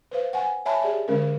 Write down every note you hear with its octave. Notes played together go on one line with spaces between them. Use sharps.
B4 C5 F5
F#5 G#5
C#5 E5 G#5 A5 B5
G4 G#4 D5 E5
D3 G#3 C#4 A#4